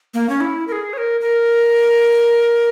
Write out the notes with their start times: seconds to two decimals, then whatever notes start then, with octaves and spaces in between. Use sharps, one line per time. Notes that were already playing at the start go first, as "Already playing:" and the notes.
0.14 A#3
0.29 C#4
0.41 E4
0.68 A#4
0.72 G#4
0.93 C#5
0.98 A#4
1.21 A#4